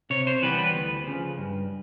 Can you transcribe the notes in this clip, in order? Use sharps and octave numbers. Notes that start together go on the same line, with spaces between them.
C3 C#5
C5
E3 G3 B3 B4
B4
D2
C#3 F3
G2